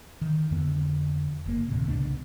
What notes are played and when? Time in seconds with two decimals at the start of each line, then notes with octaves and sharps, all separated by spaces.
0.21 D#3
0.51 F2 D3 B3
1.46 F#1 A#3
1.68 D#2 A2 C3
1.85 C2 C#3 B3 D4